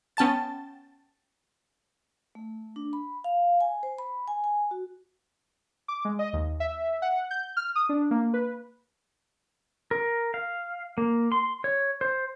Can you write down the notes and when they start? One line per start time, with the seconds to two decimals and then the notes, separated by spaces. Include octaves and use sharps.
0.17 B3 C#4 G5 A5 A6
2.35 A3
2.76 D4
2.93 B5
3.24 F5
3.61 G#5
3.83 C5
3.98 B5
4.28 G#5
4.44 G#5
4.71 F#4
5.88 D6
6.05 G#3
6.19 D#5
6.33 D#2
6.60 E5
7.02 F#5
7.31 G6
7.57 F6
7.75 D#6
7.89 D4
8.11 A#3
8.34 B4
9.91 A#4
10.34 F5
10.98 A#3
11.32 C6
11.64 C#5
12.01 C5